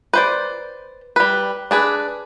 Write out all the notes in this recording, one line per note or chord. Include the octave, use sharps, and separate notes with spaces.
B4 C5 D5
G3 B4
D4 G#4 B4